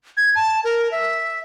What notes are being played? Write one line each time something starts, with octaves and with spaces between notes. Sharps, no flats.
G#6
A5
A#4
E5